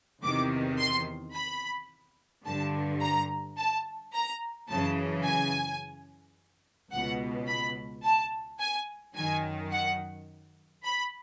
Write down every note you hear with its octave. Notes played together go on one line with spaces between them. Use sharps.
E2 C3 D#3 D6
C6
B5
G2 D3 A5
A#5
A5
A#5
F#2 C#3 E3 A5
G#5
C#2 B2 F#5
B5
A5
G#5
F#2 D#3 G#5
F#5
B5